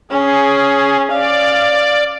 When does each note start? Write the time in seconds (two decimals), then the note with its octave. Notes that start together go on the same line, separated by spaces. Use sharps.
0.11 C#4 G#4
1.11 D5 F5